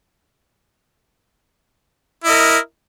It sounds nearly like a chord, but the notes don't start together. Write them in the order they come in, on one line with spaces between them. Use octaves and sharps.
E4 D#5 A#4